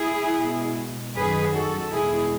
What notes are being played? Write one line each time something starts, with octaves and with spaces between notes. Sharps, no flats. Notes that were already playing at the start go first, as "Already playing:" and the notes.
Already playing: E4 G#4
B2 G#3
F#2 D#3 F#3 G#4 B4
F#4 A4
E2 B2 G#3 E4 G#4